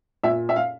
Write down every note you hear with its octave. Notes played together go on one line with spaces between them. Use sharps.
A#2 E5
E5
F5